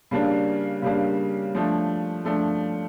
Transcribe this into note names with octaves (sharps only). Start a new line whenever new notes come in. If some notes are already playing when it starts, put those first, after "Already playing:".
C#3 G3 A#3 D4
C#3 G3 A#3 D4
F3 A3 D4
F3 A3 D4